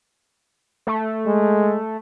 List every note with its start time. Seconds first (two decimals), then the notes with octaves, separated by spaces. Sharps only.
0.87 A3
1.26 G#3